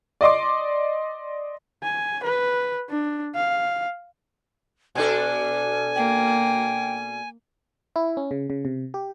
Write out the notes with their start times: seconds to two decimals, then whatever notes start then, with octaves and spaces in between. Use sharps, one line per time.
0.21 D5 D#5 C6 D6
1.83 G#5
2.24 B4
2.90 D4
3.35 F5
4.95 B2 D4 A4 G#5
5.95 A#3 G5
7.96 E4
8.17 C#4
8.31 C#3
8.50 C#3
8.65 C3
8.94 G4